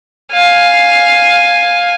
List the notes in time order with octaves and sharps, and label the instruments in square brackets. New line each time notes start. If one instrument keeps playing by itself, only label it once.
[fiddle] F5 G#5